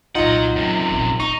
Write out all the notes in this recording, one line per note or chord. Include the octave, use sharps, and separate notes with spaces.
C2 A#2 F#3 D#4 F4 D#5 F#5
F#2 C3 F#3
E1 A#1
D#2 C4 D#4 C#6